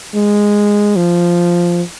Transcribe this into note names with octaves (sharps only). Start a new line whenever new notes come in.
G#3
F3